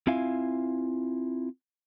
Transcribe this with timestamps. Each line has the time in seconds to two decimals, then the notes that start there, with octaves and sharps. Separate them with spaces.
0.07 C4 E4 F4 E5 F5 G#5